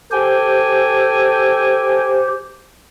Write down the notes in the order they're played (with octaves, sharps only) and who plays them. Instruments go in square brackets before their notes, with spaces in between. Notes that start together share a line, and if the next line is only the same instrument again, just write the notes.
[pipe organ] G4 C5 [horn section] A4 G5 G#5